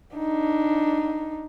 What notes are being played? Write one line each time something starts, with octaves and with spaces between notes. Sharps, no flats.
D4 D#4